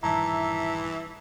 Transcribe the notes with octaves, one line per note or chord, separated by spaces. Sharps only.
A#1 G2 D#3 E3 E5 A5 A#5